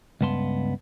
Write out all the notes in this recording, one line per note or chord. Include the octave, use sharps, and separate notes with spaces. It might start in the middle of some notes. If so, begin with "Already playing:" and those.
C#2 G2 B3 A5 C6